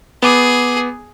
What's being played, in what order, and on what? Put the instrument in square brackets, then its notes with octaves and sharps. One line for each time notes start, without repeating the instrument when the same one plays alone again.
[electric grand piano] B3 D6 [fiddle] G#4